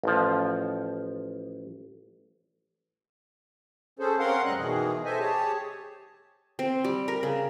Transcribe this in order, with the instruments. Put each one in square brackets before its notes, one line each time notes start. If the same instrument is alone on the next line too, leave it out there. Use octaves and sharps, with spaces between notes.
[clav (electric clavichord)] A1 F3
[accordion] C#4 G#4 A4 C5
C4 C#4 A#4 F5 F#5 C6
F#2 A2 G3 D#5 F#6
B2 D#3 E3 G#4
A4 C5 D#5 E5 G#5
G4 G#4 C#5 A5
[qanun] C4
G3
A#4
C#3